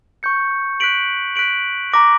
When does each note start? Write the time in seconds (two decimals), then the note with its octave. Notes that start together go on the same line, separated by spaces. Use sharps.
0.23 C#6 G6 C#7
0.80 F#6 B6 D7 F#7
1.36 F#6 B6 D7 F#7
1.92 A#5 D6 A#6 D7